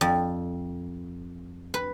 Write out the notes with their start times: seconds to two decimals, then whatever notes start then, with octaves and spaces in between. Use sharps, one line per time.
0.01 F2
1.74 B4